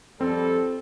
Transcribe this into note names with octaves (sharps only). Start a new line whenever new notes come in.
F2 G3 C4 A4